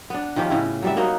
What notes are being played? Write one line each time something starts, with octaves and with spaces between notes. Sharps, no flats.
B3 D4
D#3 F3 C#4 G4
A2 C#3 C#4 E4
F#3 G3 E5
A#3 D#4 F#4 C#5